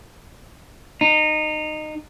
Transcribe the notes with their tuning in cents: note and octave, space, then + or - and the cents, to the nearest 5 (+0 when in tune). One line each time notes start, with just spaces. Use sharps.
D#4 -20